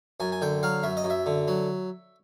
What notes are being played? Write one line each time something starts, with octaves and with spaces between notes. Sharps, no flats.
F#2 G#5
G#5
D3 G5
F#3 F5
F#2 E5
D#5
F#2
E5
D3
F#3